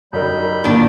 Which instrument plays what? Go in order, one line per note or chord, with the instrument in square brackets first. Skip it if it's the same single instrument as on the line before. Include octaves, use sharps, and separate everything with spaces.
[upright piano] F#2 D#4 A#4 [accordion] G3 B5 G6
[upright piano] A#1 E3 [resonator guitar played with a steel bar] D#3 D4 [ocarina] A#3